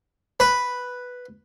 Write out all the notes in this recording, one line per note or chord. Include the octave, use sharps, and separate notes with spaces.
B4